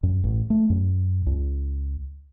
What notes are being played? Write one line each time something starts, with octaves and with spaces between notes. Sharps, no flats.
F#2
A1
A3
F#2
C#2